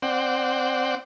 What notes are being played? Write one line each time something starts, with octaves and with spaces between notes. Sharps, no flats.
C4 D5 F#5 G5